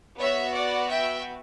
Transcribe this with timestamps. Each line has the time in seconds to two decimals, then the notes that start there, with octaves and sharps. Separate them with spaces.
0.19 B3 F#4 C#5 E5
0.54 D5 F#5
0.89 E5 G5